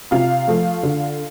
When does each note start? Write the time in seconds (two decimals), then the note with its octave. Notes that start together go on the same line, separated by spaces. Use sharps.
0.11 C3 F4 F5
0.48 F3 A3
0.83 D3